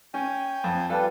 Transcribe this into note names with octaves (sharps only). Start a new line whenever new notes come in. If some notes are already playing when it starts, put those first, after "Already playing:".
C#4 G5 G#5
F2
G3 F4 A4 B4